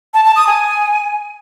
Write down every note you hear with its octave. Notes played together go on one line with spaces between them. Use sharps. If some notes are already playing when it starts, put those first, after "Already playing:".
A5
A5
D#6
G#5